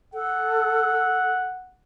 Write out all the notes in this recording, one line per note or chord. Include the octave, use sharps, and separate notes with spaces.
A4 F#5